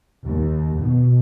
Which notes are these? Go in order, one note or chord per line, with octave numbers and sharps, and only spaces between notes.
D#2
B2